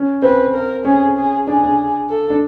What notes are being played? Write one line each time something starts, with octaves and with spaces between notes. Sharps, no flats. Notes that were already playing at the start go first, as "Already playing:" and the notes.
Already playing: C#4
C4 B4
A#4
C#4 G#4
G#4
D4 G#4
D4
A4
D4